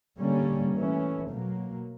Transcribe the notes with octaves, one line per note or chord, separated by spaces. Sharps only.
D3 G3 A#3 C#4
E3 A3 C#4
B2 F#3 A#3